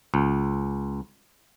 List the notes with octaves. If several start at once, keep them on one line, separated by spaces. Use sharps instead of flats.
C#2